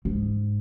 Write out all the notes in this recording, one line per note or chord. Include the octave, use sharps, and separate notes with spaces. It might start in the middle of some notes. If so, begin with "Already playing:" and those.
G#2